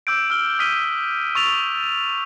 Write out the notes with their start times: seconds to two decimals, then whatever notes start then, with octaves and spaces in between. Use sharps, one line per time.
0.07 D6 E6 G6 D7
0.30 E6 F6 G7
0.59 D#6 F6 B6 D#7 G7
1.35 C#6 E6 A6 F7